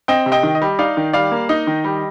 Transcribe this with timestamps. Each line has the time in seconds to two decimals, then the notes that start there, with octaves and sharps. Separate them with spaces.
0.08 C4 D#5 G5
0.26 C3
0.32 D#5 G5
0.43 D#3
0.55 D#5
0.62 G3
0.79 D#4 D5 F5
0.97 D#3
1.13 G3 D5 F5
1.32 A#3
1.49 D#4 D#5
1.67 D#3
1.84 G3